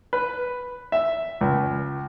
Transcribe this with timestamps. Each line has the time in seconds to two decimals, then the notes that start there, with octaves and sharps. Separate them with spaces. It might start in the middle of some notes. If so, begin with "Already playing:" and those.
0.13 B4
0.92 E5
1.41 C#2